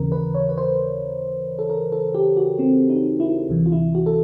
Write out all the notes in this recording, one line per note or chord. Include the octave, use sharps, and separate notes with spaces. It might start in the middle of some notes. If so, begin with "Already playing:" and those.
Already playing: D#2 C#3 E3 A#4
B4
C#5
B4
C5
A4
A#4
A4
G4
F#4
C4
D#4
E4
D2 C3 E3
F4
E4
F#4
A4